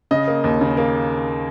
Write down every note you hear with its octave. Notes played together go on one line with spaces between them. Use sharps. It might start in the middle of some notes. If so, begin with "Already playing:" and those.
C#3 D#5
A#3
D#2
C#3
A#3